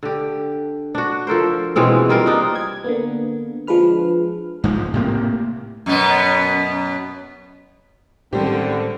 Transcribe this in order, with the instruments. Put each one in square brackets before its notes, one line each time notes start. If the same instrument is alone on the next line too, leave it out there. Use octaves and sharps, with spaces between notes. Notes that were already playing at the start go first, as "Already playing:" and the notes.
[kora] D3 G4
D4 F#4
F3 A4 A#4 C5
B2 E3 G#3 C4
G3 A#3 F4 A#4
D4 D#4 B4
[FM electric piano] G#6
D3 A#3 B3
F3 G#3 D4 B4 F6
[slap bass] G#2 F3
A2 C3 A#3
[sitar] F#2 B2 B3
[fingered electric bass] A2 G#3 C#4 [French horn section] D3 [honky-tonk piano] D#3 G3 G4 [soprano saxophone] C4